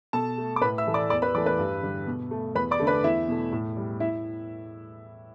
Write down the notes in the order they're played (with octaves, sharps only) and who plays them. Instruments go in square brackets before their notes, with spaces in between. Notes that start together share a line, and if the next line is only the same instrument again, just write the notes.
[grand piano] B2 A4 A5
A3
D6
A2 B4 B5
E5 E6
E3 A3
D5 D6
E2 D5 D6
B4 B5
E3 D5 D6
A3
B4 B5
G2
D3 G3
B2
A3
E2 B4 B5
D5 D6
D3 A3
B4 B5
E2 E4 E5
B2 A3
A2
G3
E4 E5